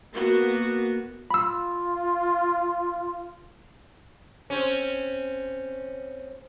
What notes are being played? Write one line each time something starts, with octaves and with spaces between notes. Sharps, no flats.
A#3 B3 F#4
F4 B5 E6
C4 C#4